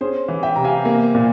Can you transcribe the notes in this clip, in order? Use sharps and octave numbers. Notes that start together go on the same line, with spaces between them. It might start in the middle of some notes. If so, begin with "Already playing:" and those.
C#4 G#4 C5
E3
E5 G5
C3 A#5
F5 G#5
A#3
A#2